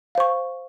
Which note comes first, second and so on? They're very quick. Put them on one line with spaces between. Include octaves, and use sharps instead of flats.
F5 C5 C#6